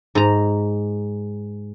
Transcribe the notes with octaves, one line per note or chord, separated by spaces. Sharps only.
G#2 A#5